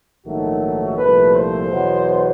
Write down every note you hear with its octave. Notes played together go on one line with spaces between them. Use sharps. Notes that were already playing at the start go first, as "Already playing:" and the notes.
A#1 G#2 D#3 F#3 A3 F#4
C2 A#2 F3 A3 B4
C5
E2 B2 F#3 B3